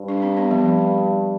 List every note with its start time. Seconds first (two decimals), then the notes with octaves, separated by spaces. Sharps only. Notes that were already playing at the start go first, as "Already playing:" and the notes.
Already playing: G2
0.08 D4
0.22 C4
0.37 B3
0.51 F3